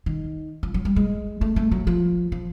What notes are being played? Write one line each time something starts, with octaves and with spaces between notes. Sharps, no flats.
D#3
F3
F#3
G3
G#3
A3
A3
F#3
F3
F3